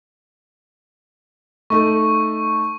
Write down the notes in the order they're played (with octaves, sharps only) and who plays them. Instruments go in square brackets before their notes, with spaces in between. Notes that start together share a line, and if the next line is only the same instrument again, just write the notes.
[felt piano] A3 D#4 A4 [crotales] C#6